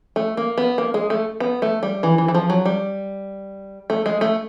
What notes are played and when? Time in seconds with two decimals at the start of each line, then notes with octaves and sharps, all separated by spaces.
0.16 A3
0.37 A#3
0.58 B3
0.78 A#3
0.94 G#3
1.10 A3
1.40 B3
1.62 A3
1.83 G3
2.03 E3
2.18 E3
2.28 E3
2.34 F3
2.50 F#3
2.65 G3
3.90 A3
4.06 G#3
4.21 A3